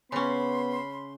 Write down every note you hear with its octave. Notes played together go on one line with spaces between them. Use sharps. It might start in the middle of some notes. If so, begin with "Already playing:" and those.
C#3 B3 C#4 B5 C6